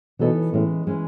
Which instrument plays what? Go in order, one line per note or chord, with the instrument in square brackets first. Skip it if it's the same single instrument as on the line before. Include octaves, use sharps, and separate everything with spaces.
[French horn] B2 [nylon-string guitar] E3 B3 D#4 A4 C#5
[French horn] A2 [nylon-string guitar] E3 G#3 C#4
[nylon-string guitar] E3 G#3 C#4